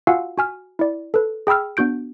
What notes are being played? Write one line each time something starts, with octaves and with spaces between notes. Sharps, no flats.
F4 F#4 F5 F#5 G#5 E6
F#4 G#5 F6
E4 D5
A4 B4
G#4 G5 B5 E6 F6
B3 D4 F#4 G6 D7